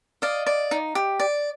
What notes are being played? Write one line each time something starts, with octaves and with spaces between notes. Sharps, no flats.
D5 D#5 F5
D5
D#4
G4
D5